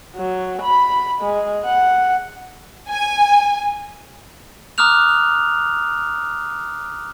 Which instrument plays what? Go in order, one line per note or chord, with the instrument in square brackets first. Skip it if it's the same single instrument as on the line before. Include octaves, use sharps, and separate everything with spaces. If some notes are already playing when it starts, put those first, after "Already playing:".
[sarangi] F#3
B5
G#3
F#5
[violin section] G#5
[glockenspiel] A#5 D6 D#6 F6 F#6 F7